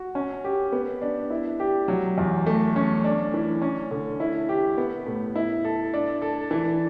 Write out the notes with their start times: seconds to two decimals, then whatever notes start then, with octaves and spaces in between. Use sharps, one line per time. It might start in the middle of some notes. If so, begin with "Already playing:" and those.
Already playing: F#4
0.15 C#4
0.44 G4
0.72 B3
1.02 D4
1.30 E4
1.60 G4
1.88 F#3
2.18 E2
2.46 A3
2.76 C#4
3.04 D4
3.34 E3
3.62 C#4
3.91 D3
4.20 E4
4.49 G4
4.78 B3
5.06 A2
5.36 E4
5.65 A4
5.94 D4
6.22 A4
6.51 E3